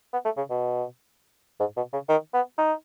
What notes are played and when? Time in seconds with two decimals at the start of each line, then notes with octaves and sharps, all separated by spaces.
0.13 B3
0.25 A3
0.37 C#3
0.50 B2
1.60 G#2
1.77 B2
1.93 C#3
2.09 D#3
2.34 B3
2.58 D#4